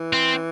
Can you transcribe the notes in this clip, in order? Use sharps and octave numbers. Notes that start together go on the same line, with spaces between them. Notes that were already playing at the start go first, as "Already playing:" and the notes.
Already playing: E3
C4